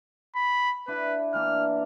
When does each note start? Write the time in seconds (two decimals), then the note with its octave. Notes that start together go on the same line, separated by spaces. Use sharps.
0.36 B5
0.88 D4 E4 B4 F#5
1.34 E3 A#3 D4 F6